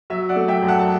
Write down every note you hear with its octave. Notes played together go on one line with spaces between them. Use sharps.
F#3 E5
D5 F#5
A3
E5 G5
F#2
F#5 A5
A5